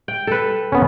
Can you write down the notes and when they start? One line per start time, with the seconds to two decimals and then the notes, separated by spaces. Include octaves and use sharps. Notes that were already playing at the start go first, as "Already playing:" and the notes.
0.08 G5
0.27 A4 B4
0.72 B3 C#4